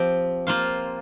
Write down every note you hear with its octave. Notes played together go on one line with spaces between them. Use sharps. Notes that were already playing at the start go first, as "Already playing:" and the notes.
Already playing: F3 C4 G4
A#3 F4 C5 F5